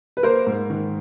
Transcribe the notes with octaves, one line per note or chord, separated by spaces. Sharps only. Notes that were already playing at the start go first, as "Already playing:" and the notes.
B4
A#3 A#4 C5
G#2
D#3